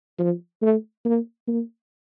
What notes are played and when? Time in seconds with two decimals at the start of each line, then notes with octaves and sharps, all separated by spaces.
0.19 F3
0.62 A3
1.05 A#3
1.48 A#3